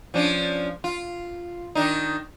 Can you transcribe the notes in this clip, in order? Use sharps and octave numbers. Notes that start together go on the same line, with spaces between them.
F3 C#4 D4
F4
D#3 D4 D#4